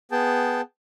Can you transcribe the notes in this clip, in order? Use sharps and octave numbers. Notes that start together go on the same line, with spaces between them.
B3 G#4 G5 A5